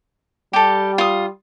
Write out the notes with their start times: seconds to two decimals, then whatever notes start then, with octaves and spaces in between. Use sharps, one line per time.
0.53 G3 G4 A4
0.98 F4 D#6